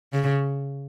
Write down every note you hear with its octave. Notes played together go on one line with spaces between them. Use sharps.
C#3